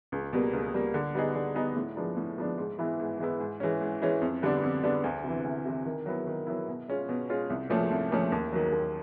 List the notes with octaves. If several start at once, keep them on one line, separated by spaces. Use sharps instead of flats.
C#2
B2 G3 A#3
C#2
B2 G3 A#3
D3
G3 B3 D#4 G#4
D3
G3 B3 D#4 G#4
A2
F3 G#3 B3 D4
A2
F3 G#3 B3 D4
G#2
E3 G#3 B3 E4
G#2
E3 G#3 B3 E4
G#2
E3 G#3 C#4
G#2
E3 G#3 C#4
F2
D3 G3 B3 D4
F2
D3 G3 B3 D4
D2
C3 E3
D2
C3 E3
D#3
F#3 B3 E4
D#3
F#3 B3 E4
B2
G#3 C#4 F4
B2
G#3 C#4 F4
C2
A#2 F3 A3 C#4
C2
A#2 F3 A3 C#4
D#2
D#3 F#3
D#2